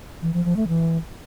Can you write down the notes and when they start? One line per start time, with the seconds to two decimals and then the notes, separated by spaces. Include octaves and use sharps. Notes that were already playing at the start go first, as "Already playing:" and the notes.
0.22 E3
0.33 F3
0.45 F3
0.56 A3
0.68 E3